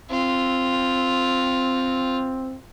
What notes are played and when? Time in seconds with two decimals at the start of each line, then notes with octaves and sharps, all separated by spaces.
0.10 C4 F4